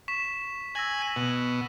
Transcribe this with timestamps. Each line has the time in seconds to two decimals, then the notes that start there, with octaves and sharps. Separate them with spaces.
0.08 C#6 B6 E7
0.75 G#5 E6 A#6 F#7
1.01 B6 D#7 F#7
1.16 B2